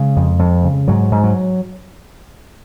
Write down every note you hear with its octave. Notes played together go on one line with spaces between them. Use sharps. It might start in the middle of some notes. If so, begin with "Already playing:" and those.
Already playing: C#3 G#3
F2
F2
C#3
G#2 F#3
G#2
F#3